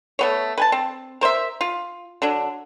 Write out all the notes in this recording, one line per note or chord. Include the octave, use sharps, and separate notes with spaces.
A3 B3 C#5
B4 G#5 A5
C4
A#4 C5 D#5 E5
F4
D3 F#3 D4